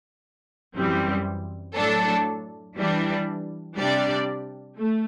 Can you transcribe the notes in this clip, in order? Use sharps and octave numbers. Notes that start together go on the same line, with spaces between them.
F#2 E3 G3 C4
A2 F#3 A3 D4 A4
E3 G3 D4
C3 G3 D4 G4 D5
A3